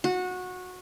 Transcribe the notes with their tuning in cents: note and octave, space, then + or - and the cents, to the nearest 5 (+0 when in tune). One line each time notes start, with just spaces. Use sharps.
F#4 -20